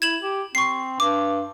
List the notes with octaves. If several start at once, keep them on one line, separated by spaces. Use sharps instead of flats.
E4 G#6 E7 F#7
G4
C4 C#6 C7
G2 D6